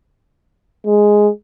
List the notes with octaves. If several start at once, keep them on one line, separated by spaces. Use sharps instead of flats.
G#3